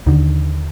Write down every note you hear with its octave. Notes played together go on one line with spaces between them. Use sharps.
D#2 D3 D#3